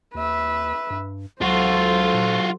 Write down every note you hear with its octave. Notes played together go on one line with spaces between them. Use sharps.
D#2 B4 E5
G2
C#2 F#3 F4 F#4 A4 C5
A#2